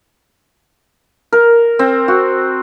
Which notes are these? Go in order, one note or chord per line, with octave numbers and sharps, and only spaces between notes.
A#4
C4
F#4